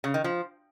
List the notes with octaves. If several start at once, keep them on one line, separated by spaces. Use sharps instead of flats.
C#3
D#3
F3